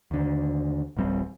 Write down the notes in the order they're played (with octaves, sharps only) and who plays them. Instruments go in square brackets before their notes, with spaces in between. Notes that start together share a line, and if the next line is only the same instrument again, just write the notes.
[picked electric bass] D#2 D3
D1 A1 G3 C4